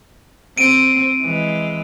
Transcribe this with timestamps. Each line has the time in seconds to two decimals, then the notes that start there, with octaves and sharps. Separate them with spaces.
0.58 C4 D7 D#7
1.22 E3 G#3